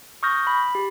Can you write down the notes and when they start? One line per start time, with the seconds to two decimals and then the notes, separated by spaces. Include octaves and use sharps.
0.23 C#6 D#6 F6 G6 A#6
0.47 B5
0.75 G4